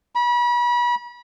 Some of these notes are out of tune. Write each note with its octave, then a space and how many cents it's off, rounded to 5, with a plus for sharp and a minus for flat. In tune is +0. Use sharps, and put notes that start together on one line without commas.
B5 -35